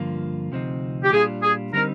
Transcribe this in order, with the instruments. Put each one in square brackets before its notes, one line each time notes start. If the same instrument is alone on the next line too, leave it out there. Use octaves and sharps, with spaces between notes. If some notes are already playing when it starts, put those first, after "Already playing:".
Already playing: [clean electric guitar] G2 D3 F3 A#3 F4
D2 C3 F3 C4 D#4
[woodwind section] G4
[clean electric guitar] A#2 G3 D4 F4 [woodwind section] G#4
[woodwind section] G#4
[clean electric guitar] D3 G3 C4 D#4 [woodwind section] A#4